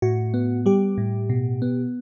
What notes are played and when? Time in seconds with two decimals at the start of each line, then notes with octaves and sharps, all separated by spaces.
0.02 A2 F#4
0.34 B3
0.66 G3 G4
0.98 A2
1.29 B2
1.62 B3